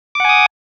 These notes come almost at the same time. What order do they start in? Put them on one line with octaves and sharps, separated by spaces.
D6 F#5 G#5 D#6